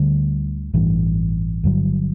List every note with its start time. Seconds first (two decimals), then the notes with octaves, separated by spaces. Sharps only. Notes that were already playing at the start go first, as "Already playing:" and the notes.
Already playing: D2 D3 G3
0.74 A1 G2 E3
1.64 G1 G2 D3 F#3